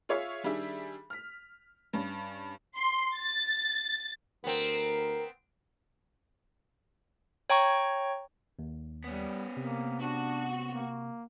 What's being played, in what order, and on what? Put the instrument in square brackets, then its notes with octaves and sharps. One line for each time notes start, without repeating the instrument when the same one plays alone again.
[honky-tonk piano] F4 G#4 C#5 E5 F5 C#6
D#3 G3 D4 G#4 E5
F6 B6
G2 C#4
[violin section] C6
A6
[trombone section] D2 A#4 [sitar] B3 C4
[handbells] C#5 G5 A#5 C#6
[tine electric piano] D#2
[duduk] G3 [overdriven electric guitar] B3 C#4
[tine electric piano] C3 [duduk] A#3
[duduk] D4 [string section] F#4
[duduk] A#3